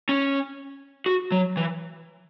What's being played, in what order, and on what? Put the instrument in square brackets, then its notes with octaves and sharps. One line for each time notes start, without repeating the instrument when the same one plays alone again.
[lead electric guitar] C#4
F#4
F#3
E3